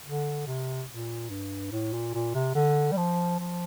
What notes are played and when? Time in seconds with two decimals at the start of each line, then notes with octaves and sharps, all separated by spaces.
0.05 D3
0.46 C3
0.89 A#2
1.30 G2
1.72 A2
1.93 A#2
2.14 A#2
2.35 C3
2.55 D3
2.92 G3
2.97 F3
3.39 F3